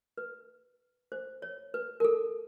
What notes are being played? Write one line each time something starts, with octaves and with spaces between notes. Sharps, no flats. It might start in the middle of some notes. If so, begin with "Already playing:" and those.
B4
C5
C#5
B4
A#4
A4